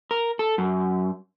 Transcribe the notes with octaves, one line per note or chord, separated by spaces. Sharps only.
A#4
A4
F#2